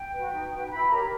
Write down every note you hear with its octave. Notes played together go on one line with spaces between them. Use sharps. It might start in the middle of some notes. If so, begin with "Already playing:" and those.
Already playing: G5
F#4 B4
D#4
F#4 B4
E4 B5
G4 A#4 C#5 A#5